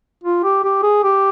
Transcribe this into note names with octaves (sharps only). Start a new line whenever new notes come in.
F4
G4
G4
G#4
G4